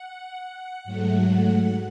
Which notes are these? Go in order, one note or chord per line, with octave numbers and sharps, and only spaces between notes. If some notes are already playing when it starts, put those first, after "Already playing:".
Already playing: F#5
G#2 F#3 A3